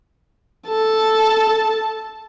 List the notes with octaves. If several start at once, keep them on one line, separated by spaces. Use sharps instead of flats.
A4 A5